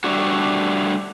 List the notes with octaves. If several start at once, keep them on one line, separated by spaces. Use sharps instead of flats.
G3 A3 D4 F#4